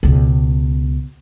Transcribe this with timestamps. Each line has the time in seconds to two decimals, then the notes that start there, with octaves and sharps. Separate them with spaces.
0.03 C#2 B2